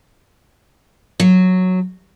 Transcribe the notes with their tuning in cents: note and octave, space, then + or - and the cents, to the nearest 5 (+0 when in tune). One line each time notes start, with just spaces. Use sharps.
F#3 -5